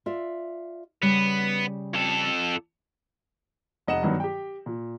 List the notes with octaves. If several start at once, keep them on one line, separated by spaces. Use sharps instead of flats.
F4 D5 E5
C#3 G3 B3
F2 A4
F1 D#5 F#5 E7
G2 D#3 F#3 B3
G4 G5
A#2